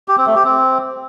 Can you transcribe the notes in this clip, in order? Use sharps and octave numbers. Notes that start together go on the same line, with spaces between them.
G4
C4
A3
G4
C4